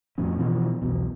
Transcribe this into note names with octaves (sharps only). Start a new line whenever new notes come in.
F2 A2 F3 C#4
B2 E3 F3
B1 E2 B2